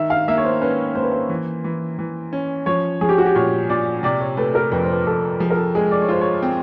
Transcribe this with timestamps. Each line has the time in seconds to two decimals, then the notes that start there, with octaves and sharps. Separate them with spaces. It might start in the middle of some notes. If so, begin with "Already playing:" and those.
Already playing: D#3 E5
0.10 F5
0.28 A#3 E5
0.37 C#5
0.45 C5
0.61 C#4 B4
0.95 A#3 C5
1.03 B4
1.12 C5
1.29 E3
1.64 E3
1.99 E3
2.33 C#4
2.66 F3 C#5
3.01 F3 G#4
3.09 G4
3.18 F#4
3.26 G4
3.35 A#2 C#5
3.69 A#2 D5
4.03 C3 D5
4.20 C#5
4.37 A3 B4
4.55 A#4
4.72 F2 B4
4.82 C5
4.91 B4
5.07 F2 A4
5.40 F3 G#4
5.50 A#4
5.57 A4
5.75 G#3 G#4
5.91 D5
6.02 C#5
6.08 F4 C5
6.21 C#5
6.42 C4